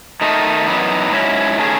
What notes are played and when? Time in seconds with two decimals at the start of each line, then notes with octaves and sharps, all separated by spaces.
0.21 D#3 A3 D#4
0.66 F#2 E3 B3 D#4
1.11 G#2 F#3 C#4 E4
1.57 D#3 A3 C#4 G#4